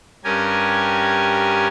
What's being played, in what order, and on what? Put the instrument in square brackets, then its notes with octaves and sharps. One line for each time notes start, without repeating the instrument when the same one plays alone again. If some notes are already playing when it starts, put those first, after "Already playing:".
[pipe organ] G2 C#4 G4 A#4 G#5